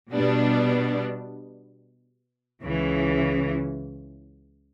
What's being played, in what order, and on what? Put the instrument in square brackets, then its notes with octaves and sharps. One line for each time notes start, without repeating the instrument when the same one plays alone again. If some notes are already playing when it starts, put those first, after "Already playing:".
[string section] B2 G3 B3 D4
C#2 C#3 E3